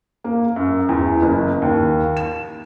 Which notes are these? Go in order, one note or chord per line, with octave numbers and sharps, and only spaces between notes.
A#3
F#2
E2
F#1
D#2
E7